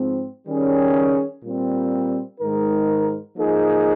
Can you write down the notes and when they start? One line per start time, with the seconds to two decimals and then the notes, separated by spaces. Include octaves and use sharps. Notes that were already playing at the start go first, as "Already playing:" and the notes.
Already playing: G#2 F3 C4
0.46 D#3 G3 C#4 G#4
1.43 A#2 G3 C4
2.40 G#2 D#3 G#3 D#4 A#4
3.36 F3 A#3 D#4 G#4